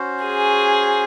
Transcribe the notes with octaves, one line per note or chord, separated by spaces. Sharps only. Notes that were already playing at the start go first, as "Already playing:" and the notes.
Already playing: C#4 F#4 C5
G#4